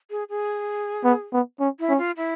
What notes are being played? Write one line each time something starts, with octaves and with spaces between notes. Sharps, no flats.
G#4
G#4
B3
B3
C#4
E4
C#4
F4
E4